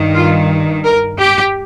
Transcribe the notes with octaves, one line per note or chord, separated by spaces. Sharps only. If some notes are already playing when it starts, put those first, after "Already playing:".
Already playing: G2 D#3
F4
A#4
G4